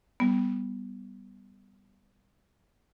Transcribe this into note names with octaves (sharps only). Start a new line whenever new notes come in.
G3 B3